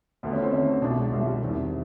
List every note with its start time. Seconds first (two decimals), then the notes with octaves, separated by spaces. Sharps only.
0.23 D2 D3 B3
0.33 C#4
0.42 C4
0.53 D2 D3 C#4
0.67 D4
0.82 C2 B2 D4
0.97 G#3
1.11 C2 B2 G#3
1.26 G3
1.41 E2 C3 D#3